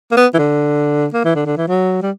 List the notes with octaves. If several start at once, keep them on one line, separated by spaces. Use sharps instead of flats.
A#3
B3
E3
D3
A#3
E3
D3
D3
E3
F#3
G3